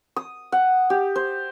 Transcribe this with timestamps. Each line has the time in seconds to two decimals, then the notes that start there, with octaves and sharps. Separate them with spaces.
0.16 D#6
0.52 F#5
0.90 G4
1.16 C5